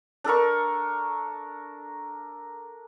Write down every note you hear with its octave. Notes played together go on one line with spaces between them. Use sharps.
D4 A4 A#4 C#6